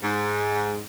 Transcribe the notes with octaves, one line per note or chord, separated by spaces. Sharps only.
G#2